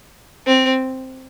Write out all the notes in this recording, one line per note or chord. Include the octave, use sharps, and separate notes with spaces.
C4